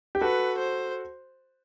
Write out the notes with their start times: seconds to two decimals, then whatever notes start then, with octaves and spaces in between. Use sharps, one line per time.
0.15 G4
0.21 F#4 A4 B4
0.58 C5